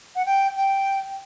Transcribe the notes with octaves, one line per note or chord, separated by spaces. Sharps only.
F#5
G5
G5